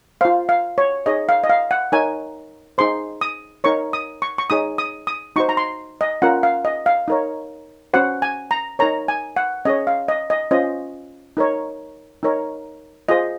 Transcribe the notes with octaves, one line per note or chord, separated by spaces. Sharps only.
F4 C5 F5
F5
C#5
D#4 G#4 C#5 D#5
F5
D#5
F5
F#5
D#4 A#4 C#5 G#5
D#4 G#4 C5 C6
D#6
D#4 A#4 C#5 C#6
D#6
C#6
C#6
D#4 G#4 C#5 D#6
D#6
D#6
D#4 F#4 C5 C#6
A#5
C6
D#5
C#4 F4 A#4 F#5
F5
D#5
F5
D#4 A#4 C#5
C#4 F#4 C5 F#5
G#5
A#5
D#4 A#4 C#5 A#5
G#5
F#5
C#4 G#4 C#5 D#5
F5
D#5
D#5
C#4 F4 C5 D#5
D#4 A#4 C#5
D#4 A#4 C#5
F4 G#4 C5 D#5